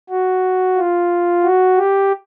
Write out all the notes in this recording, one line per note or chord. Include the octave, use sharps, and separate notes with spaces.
F#4
F4
F#4
G4